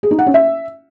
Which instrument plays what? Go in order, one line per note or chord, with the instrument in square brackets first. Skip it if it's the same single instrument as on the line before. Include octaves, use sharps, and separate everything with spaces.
[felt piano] G#4
D#4
F#5
C#4
E5